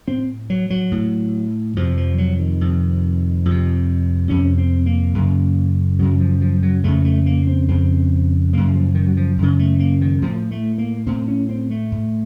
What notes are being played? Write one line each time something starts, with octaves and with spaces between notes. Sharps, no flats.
A2 C4
F#3
F#3
A2
F2 C3 F3
F3
F#3
D#3
F2 C3
F2 C3
F2 C3 C#4
C4
A#3
F#2 C#3
F#2 C#3 F#3
F3
F3
F#3
F2 C#3 A3
A3
A#3
C4
F2 C#3 C4
F#2 C#3 A#3
F3
D#3
F#3
F3
F#2 C#3
A3
A#3
D#3
A2 F3
A3
A#3
A2 C4
C#4
C4
A3
A2